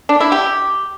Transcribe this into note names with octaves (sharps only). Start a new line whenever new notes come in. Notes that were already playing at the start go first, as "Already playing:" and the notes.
D4
E4
G4